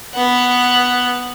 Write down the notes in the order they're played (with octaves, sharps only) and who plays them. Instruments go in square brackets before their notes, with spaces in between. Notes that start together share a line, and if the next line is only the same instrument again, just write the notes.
[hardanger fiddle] B3 F#5